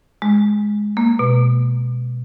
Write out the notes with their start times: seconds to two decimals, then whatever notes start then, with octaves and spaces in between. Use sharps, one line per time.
0.22 G#3
0.97 A#3
1.19 B2